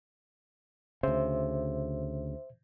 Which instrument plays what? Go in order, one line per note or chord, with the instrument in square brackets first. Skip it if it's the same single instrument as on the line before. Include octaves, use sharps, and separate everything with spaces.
[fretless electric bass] D2 C#3 [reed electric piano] C5 E5